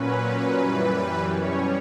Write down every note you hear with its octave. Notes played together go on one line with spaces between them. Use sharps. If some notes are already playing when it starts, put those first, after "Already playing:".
Already playing: A#2 F#3 C#4 B4
F#2 E3 G3
B2 G3 C#4 C#5